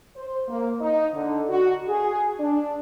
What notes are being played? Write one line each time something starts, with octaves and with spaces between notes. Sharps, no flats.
C5
A#3
D#4
D3
F#4
G#4
D4